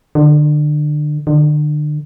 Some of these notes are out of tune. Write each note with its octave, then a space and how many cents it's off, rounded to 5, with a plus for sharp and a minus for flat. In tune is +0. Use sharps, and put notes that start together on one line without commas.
D3 +30
D3 +35